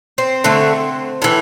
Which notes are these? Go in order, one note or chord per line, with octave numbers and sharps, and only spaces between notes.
C4
D3 A3
A2 E3